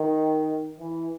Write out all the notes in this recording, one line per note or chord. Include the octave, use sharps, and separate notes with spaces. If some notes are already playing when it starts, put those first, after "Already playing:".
Already playing: D#3
E3